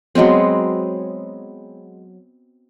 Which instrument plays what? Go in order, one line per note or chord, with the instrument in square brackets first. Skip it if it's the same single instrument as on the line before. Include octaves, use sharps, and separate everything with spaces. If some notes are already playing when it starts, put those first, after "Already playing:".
[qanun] F#3 G#3 B3 C4